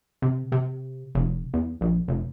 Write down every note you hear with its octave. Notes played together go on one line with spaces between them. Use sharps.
C3
C3
F1
E2
A#1
F1